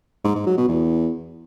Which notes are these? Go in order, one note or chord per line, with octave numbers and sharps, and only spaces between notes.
G#2
G#2
F#3
B2
E2